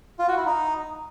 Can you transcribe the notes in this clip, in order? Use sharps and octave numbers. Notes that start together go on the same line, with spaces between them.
F4
F#4
E4
D#4